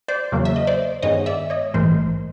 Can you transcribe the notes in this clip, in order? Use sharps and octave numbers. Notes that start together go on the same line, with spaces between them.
C5 D5
E2 C#3 F#3 A#3
E5
D#5
C5 D5
G2 D#3 G#3 B3 C#5 D#5
D5 E5
C#5 D#5
A#1 G#2 E3 A3 A#4 C5